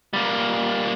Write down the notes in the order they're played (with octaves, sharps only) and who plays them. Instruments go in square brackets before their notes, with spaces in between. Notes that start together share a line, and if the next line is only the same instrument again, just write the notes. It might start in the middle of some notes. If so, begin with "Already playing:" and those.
[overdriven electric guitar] G3 A#3